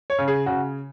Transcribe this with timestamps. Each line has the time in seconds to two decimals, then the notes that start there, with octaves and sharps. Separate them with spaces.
0.10 C#5
0.19 C#3
0.28 G#4
0.46 C#3 F#4